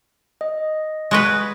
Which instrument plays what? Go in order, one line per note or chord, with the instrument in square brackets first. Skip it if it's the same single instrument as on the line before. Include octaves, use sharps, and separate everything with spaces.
[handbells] D#5
[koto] G#3 F#4 B4